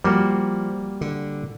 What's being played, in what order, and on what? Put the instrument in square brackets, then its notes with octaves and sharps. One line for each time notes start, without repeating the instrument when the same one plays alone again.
[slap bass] F3 [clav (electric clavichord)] G3 A#3 F#4
[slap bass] D3